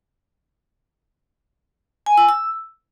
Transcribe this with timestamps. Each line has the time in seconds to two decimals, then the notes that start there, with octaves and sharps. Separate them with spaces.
2.06 G#5
2.18 E6
2.29 E6